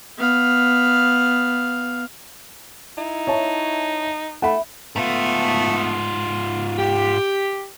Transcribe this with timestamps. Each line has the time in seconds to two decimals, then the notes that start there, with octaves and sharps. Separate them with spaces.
0.18 B3 F5
2.98 D#4 E4
3.27 C#5 E5 A5
4.42 A3 E5 F#5 B5
4.96 G#2 A3 B3 F4
6.78 G4